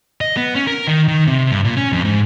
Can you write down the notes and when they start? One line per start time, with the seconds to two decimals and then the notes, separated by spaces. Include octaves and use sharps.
0.21 D#5
0.37 B3
0.55 C#4
0.67 A#4
0.87 D#3
1.08 D#3
1.27 C3
1.51 G2
1.64 A#2
1.77 C#4
1.93 F2
2.05 G#2